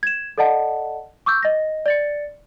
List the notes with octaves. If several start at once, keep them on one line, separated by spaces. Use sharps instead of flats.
G#6 E7
A4 D5 D#5 F#5 A5
C#6 D6 E6 G6
D#5 A#6
D5 A6 C#7